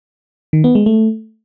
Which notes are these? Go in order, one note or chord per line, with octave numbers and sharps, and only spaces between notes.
D#3
B3
G#3
A3